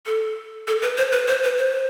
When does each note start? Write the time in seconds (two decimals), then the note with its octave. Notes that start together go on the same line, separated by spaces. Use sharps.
0.06 A4
0.67 A4
0.82 B4
0.98 C5
1.12 B4
1.28 C5
1.43 B4
1.58 C5